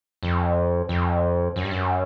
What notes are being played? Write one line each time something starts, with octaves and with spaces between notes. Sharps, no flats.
F2
F2
F#2
G2
F#2